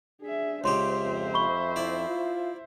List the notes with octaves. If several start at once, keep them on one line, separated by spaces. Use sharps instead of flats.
D4 G#4 E5
C#2 C#3 G4 C5 C#5 E5 C6
F2
B5 C#6 G7
E4 D5
F4